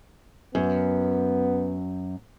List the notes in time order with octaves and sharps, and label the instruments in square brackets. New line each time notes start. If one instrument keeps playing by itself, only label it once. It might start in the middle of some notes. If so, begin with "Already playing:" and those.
[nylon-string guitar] F#2 [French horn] B3